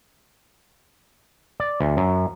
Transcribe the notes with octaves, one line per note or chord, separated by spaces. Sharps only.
D5
D2
F#2